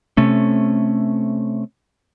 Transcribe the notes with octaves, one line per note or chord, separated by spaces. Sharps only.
C3 A3 C#4